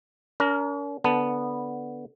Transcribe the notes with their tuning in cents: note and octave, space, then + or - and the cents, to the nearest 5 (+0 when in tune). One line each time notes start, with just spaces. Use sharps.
C#4 +45 A#4 +0
D3 -5 B3 -5 A5 -5